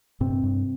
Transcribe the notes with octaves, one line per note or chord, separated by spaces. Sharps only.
G2 C3 C4
G2